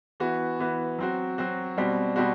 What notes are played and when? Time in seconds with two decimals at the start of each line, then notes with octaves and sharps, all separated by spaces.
0.20 E3 B3 F#4
0.59 E3 B3 F#4
0.99 F#3 C4 F#4
1.38 F#3 C4 F#4
1.77 B2 G3 C4 F#4
2.16 B2 G3 C4 F#4